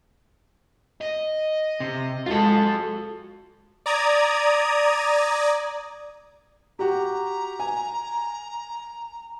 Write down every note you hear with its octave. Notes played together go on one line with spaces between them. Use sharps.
D#5
C3
G#3 F4 F#4 A4
D5 A#5 D#6 G#6
F#4 G4 A#5
G#5